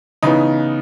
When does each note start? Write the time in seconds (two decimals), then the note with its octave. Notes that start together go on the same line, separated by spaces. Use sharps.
0.23 C#3 E3 B3 D#4